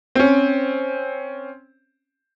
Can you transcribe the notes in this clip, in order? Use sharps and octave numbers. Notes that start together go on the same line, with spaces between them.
C4 C#4